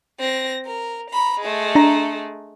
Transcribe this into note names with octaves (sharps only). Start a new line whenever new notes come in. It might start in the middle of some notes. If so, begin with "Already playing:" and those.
C4 A#6
A#4
A#5 B5
G#3 A3
D4 A#5